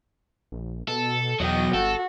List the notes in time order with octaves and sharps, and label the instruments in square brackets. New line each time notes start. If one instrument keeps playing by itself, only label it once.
[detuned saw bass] A#1
[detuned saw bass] B2 [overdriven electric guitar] A4
[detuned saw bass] E2 [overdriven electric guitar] B2 F#3 [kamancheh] D#5 G5
[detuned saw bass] G1 [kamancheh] F#4 [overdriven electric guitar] A4